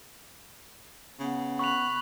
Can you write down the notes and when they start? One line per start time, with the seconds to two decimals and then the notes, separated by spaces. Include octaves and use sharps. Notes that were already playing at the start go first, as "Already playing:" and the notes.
1.20 C#3 B3
1.59 B5 C#6 F#6 F7